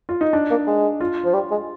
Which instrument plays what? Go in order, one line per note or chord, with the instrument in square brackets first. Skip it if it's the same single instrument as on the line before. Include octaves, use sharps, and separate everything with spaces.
[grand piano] F4
D#4
D4
[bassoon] A#3
G#3
[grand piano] F4
[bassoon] F3
G3
G#3